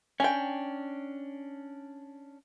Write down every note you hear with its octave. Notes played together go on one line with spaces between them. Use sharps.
C#4 D4 G5 G#5